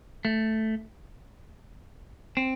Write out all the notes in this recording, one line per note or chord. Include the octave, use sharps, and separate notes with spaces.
A3
C4